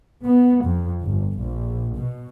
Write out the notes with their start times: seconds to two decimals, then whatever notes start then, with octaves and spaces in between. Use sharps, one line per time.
0.23 B3
0.64 F2
1.03 G1
1.38 A#1
1.95 B2